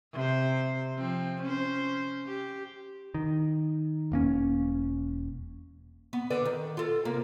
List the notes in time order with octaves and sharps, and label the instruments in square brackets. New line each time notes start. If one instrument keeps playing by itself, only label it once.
[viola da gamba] C3 C5
F3 C4
C#4 C5
G4
[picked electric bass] D#3
E1 A#3 C#4
[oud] B3
D3 B4 D5
D#3
F4 A4
C3 A#3